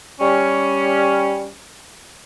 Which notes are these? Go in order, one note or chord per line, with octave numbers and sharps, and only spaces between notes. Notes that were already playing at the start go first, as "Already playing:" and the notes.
G3 C#4